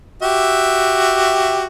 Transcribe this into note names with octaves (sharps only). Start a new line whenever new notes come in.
F#4 G4 E5